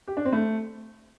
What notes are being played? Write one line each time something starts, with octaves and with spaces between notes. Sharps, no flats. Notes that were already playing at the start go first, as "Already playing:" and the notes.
G4
D4
C4
A3